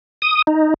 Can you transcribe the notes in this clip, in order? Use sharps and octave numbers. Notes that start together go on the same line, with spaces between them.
D#6
D#4